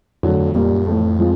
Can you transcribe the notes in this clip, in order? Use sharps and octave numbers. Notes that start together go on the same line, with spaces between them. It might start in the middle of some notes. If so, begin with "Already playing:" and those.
F2 D3 F#3 A3
F2
F2 A#2 G3 A#3
F#2
F2 A2 E3 A3
F3 G#3 C4 F4